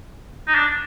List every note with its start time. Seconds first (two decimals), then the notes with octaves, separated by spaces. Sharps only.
0.47 D#4
0.55 D4